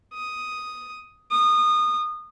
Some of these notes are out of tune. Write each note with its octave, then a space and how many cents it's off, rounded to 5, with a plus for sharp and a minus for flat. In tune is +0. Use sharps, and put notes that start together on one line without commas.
D#6 +5
D#6 -25